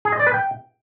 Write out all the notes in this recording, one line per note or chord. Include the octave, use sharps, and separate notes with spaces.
G#4
D#5
D5
B4
G5